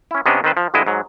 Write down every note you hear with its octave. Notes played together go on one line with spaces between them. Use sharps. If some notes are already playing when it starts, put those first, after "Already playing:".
C#4 E4
C3 B3 C#4 D4 D#5
D#3 C4 B4 C5
F3
G2 D3 G#3 E4 D#5
G#2 F#3